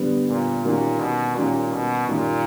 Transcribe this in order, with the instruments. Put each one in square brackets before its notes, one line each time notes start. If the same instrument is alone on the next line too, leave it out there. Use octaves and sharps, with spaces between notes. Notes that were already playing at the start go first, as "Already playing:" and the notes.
Already playing: [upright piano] D3 G3 B3
[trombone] A#2
[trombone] A#2 [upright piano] D#3 G3 A#3 C#4 F#4
[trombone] B2
[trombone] A#2 [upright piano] D#3 G3 A#3 C#4 F#4
[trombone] B2
[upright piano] F#2 D#3 G3 [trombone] A#2